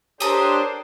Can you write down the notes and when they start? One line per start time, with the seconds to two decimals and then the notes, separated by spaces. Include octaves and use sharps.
0.20 D4 G4 A4 A#4 C5 C#5 D#6